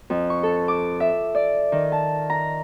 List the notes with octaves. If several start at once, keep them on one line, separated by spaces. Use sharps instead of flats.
F2
C#6
A4
D6
E5
D5
D#3
A5
A#5